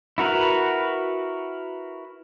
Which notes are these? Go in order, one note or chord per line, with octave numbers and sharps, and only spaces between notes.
E4 F#4 A#4 B4